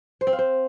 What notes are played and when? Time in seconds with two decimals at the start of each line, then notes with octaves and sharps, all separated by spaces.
0.21 C5
0.27 C4
0.33 F5
0.39 C5